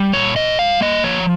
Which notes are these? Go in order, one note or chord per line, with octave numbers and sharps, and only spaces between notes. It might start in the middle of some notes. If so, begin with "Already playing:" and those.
Already playing: G3
A#2 C#5
A#2 D#5
G3 F5
A#3 D#5
F3 C#5